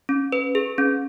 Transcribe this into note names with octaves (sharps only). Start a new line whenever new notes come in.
C#4
B4
G#4
C#4